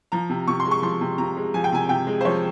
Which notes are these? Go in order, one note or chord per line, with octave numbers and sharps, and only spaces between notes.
F3 A#5
C3
C3 C#6
C6
G#3
C#6
F3 C6
C3
C3 A#5
G#3
F3 G#5
G5
C3 G#5
C3 G5
G#3
C5
F3 C#5